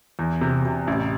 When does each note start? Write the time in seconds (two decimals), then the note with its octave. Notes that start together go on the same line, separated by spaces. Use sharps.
0.19 E2
0.41 C3
0.65 C3
0.87 A1